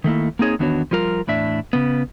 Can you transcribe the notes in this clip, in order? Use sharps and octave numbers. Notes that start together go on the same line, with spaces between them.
D#3 A3 A#3 E4
A#3 C4 D#4 G#4 C#5
E2 D#3 B3 D4 F#4 C#5
F3 G3 F4 A#4
E2 A2 D4 E5
C#3 B3